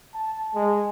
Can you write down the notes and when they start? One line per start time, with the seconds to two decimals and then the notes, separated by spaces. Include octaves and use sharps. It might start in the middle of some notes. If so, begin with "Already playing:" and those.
0.14 A5
0.54 G#3